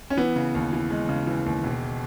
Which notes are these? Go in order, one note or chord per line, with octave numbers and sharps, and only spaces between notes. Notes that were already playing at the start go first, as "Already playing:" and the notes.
C#4
E3 B3
C#3
D#2
E3
G#3
C#3
E3
D#2
E1